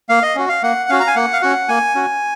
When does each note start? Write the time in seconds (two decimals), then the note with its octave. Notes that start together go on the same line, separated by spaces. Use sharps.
0.09 A#3 F5
0.22 D#5
0.35 C#4 F#4
0.49 F5
0.63 A#3 F#5
0.89 C#4 F#4 F5
1.00 A#5
1.07 G#5
1.16 A#3 F#5
1.33 F5
1.42 C#4 F#4 F#5
1.69 A#3 G#5
1.95 C#4 F#4